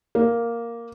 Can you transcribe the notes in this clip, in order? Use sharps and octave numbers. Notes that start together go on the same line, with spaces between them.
A#3